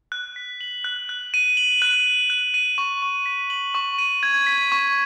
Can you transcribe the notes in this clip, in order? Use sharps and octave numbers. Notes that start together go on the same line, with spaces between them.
F#6
B6
F#7
F#6
F#6
D#7
F#7
F#6
F#7
F#6
D#7
C#6
C#6
B6
F#7
C#6
D#7
G#6
B6
C#6